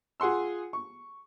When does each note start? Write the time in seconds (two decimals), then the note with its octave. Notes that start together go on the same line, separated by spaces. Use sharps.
0.20 F4 G#4 F#5 C6 E6
0.73 C#6